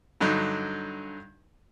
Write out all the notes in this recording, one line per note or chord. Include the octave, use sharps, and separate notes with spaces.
G2 D3 F#3 D#4